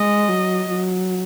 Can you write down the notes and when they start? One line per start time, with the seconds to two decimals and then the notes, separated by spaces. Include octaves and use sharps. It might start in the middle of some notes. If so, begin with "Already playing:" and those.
Already playing: G#3 D#5
0.29 F#3
0.70 F#3